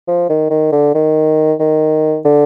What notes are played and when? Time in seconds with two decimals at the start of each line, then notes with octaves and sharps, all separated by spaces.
0.08 F3
0.29 D#3
0.51 D#3
0.72 D3
0.95 D#3
1.60 D#3
2.25 D3